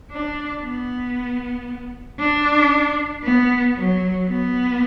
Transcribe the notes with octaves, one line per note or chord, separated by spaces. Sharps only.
D4
B3
D4
B3
F#3
B3